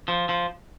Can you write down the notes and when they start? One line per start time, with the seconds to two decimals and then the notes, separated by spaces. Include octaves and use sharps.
0.08 F3
0.29 F3